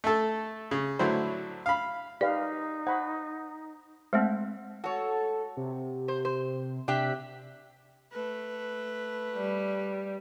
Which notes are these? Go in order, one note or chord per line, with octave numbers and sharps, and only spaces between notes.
A3 A4
C#3
A2 D3 F#3 E4 C5
F5 B5
D#4 G4 B4 D5 F5
C5 F#5 B5 C#6
G#3 A3 C4 C5 E5 F#5
F#4 A4 C#5
C3
C5
C5
C3 D4 G4 E5
A3 B4
G3